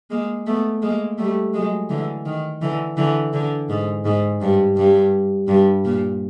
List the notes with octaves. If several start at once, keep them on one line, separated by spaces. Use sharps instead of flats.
G#3 A#3
A3 B3
G#3 A#3
G3 A3
F#3 G#3
D3 E3
D#3
D3 E3
D3 E3
D3
G#2
G#2
G2
G2
G2
A#2